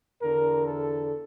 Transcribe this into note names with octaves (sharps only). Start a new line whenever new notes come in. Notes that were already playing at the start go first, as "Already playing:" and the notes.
E2 D3 A#4
A4